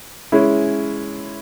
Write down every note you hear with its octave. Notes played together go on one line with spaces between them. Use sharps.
G#3 C#4 E4